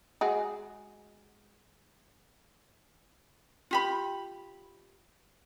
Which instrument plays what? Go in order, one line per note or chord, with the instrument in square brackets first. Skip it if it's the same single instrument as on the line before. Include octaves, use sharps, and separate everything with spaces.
[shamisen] G#3 F#4 G#4
[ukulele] F4 G4 B5